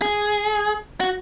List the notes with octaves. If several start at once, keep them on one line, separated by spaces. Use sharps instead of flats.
G#4
F#4